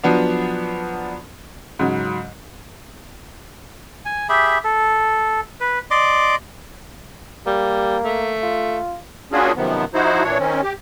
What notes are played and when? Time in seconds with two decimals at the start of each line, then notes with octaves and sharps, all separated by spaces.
0.04 F3 F#3 B3 D4
1.79 G#2 C#3 F#3
4.05 G#5
4.29 G4 G#4 E5 B5
4.64 A4
5.60 B4
5.91 D5 D#5 C6 D6
7.47 G3 A#3
8.04 A3
8.43 F4
9.32 A#3 C#4 D4 F4 F#4 G#4
9.56 F#2 C3 D#3 F3 B3
9.94 F3 D#4 E4 F#4 C5
10.23 A#2 E3 D4 C#5
10.39 D#3 C4 C#4
10.63 G4